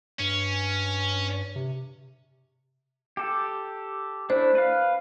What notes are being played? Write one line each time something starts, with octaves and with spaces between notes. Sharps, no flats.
G2 C#4
C3
G4 A4
A3 D4 E4 C5
B4 F5